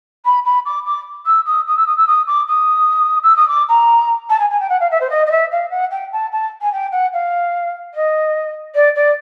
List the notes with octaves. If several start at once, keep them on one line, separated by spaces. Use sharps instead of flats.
B5
B5
D6
D6
E6
D#6
D#6
E6
D#6
E6
D#6
D6
D#6
E6
D#6
D6
A#5
A5
G#5
G#5
G5
F#5
F5
E5
C5
D#5
D#5
E5
F5
F#5
G5
A5
A5
G#5
G5
F#5
F5
D#5
D5
D5